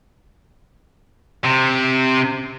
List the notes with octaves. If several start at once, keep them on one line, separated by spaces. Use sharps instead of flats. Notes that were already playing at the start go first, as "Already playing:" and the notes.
C3